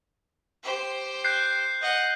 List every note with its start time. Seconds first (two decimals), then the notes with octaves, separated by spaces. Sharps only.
0.63 G4 C5
1.24 F#6 G6 C7
1.81 D#5 F#5